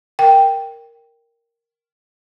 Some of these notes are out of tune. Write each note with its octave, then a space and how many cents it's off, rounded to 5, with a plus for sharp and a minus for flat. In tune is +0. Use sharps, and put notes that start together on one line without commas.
A#4 +0 G5 +0